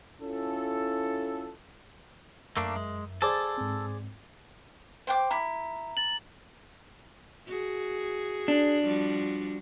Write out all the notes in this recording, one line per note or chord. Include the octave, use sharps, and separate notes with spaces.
C#4 E4 F4 A4
F#2 A3 A#3 D4 A#4 E5
G#3
G#4 A4 C5 D5
G#2 C4
C5 G5 D6
E4 A#5
A6 F#7
F#4 G#4
D4
F3 G3 F#4